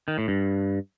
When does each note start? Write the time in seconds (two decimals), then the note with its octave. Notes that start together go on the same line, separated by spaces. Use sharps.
0.08 D#3
0.18 A2
0.28 G2